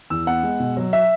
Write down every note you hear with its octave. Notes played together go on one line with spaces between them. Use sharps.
E2 E6
B3 F#5
G#3
B2
F#3
E5